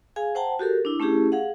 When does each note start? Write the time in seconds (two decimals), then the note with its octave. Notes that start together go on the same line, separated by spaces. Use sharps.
0.16 G#4 F5 G#5
0.35 C5 F#5 G5 A5 A#5
0.59 F#4 G4 A4 A#4
0.85 D4 E4
1.00 A3 C#4 E4 G4 G#4
1.32 G#4 F5 F#5